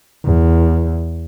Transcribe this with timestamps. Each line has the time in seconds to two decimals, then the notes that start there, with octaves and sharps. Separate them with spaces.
0.25 E2